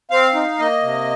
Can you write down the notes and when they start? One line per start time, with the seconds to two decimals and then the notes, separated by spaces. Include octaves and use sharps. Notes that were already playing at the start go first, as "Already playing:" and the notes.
0.11 C4 F5
0.35 D#4
0.59 A#3 D#5
0.82 C3